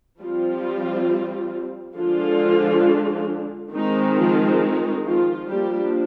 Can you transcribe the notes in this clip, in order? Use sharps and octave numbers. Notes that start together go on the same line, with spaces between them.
F3 G3 C4 F4
D3 F3 G#3 D4 F4
D#3 G#3 C4 D#4
F3 F4
D#4
F3 F4
F3 G3 A#3 D4 G4